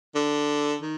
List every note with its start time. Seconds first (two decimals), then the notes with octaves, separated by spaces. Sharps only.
0.15 D3
0.82 D#3